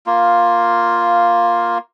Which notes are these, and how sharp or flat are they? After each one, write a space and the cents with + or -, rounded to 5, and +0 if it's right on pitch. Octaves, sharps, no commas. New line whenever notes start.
A#3 +0 F4 +0